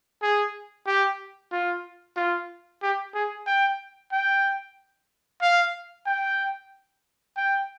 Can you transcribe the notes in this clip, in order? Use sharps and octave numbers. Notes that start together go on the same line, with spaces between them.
G#4
G4
F4
F4
G4
G#4
G5
G5
F5
G5
G5